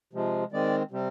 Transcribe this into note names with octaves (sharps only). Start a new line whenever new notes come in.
C3 F3 G#3
D#3 G#3 C4 D5
C3 G3 C4